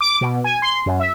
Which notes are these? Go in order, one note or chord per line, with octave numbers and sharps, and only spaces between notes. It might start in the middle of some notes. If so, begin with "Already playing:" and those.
D6
B2
G#5
C6
F#2
E5